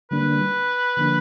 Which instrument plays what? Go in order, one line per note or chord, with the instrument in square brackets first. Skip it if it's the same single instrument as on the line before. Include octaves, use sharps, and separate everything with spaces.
[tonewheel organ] D3 G3 A#3 D4 [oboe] B4
[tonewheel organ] D3 F3 A#3 D4